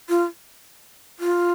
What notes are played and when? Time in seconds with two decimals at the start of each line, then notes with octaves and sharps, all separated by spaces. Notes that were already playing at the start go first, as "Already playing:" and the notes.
0.09 F4
1.20 F4